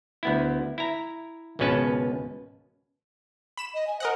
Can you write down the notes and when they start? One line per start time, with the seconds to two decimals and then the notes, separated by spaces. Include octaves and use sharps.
0.23 D2 B3 E4
0.78 E4 A#5
1.59 G#1 C#2 B2 C#4 B4 A5
3.58 B5 E7
3.74 D#5
3.87 G#5
4.00 A#4 C5 D#5 F#5